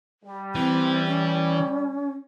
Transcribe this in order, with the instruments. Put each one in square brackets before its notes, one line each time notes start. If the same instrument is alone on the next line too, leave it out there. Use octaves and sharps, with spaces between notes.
[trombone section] G3
[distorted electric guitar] E3 [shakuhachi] C4
[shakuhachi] C#4